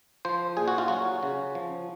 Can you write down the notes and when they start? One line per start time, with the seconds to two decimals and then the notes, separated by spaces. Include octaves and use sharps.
0.25 F3 C5
0.57 A#2 G#4
0.68 F#4
0.78 F4
0.88 F#3 F#4
1.23 C#3
1.55 F3